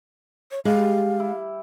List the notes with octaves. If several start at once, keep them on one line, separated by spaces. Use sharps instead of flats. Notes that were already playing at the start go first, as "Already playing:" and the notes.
C#5
G3 G#3 F5
E4